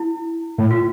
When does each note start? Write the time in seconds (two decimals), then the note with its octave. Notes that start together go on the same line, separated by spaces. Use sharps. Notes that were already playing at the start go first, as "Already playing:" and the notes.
Already playing: E4
0.58 A2
0.71 F4